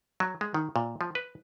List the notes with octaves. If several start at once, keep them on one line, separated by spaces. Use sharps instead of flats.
F#3
G#3
D#3
A#2
F3
B4